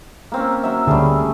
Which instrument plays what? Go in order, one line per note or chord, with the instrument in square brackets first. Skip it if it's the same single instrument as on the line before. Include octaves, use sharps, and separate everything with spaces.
[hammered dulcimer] A#3 C4 C#4
F#3 E5
[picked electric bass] D2 D3 [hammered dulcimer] G3 A3 G#4